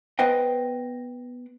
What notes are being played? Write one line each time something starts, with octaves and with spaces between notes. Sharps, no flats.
B3 B4 C5 D#5 G5